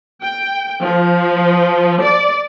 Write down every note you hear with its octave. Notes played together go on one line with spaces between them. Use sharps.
G5
F3
D5